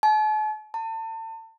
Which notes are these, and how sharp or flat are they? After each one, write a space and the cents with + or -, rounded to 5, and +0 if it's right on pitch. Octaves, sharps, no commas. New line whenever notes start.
A5 -45
A5 +35